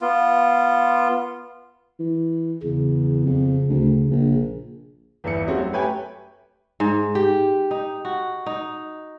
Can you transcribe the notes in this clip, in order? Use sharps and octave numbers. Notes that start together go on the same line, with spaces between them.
B3 F4
E3
E2 C#3
F2
D2
A#1
G1 E2 E4 C#7
G3 A3 C4 C#4 F#4 G#4
F#2
A3 G4 B4 C#5 G5 G#5
G#2
G4
D#4
F#4
D#4